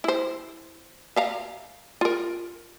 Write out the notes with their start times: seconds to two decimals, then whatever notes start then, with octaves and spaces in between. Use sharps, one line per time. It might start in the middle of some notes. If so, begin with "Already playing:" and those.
0.04 E4 C5
1.16 E5 F5 A#5
2.01 F4 A#4